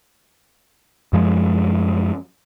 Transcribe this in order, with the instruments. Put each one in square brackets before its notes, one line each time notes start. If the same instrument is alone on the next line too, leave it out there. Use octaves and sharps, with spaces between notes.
[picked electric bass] F#2 F3 G#3